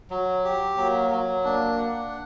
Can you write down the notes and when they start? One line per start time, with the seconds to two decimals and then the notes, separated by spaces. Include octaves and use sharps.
0.10 F#3
0.44 G4
0.77 F#3 A#3
1.11 F#3
1.44 A#3 D4
1.78 F#5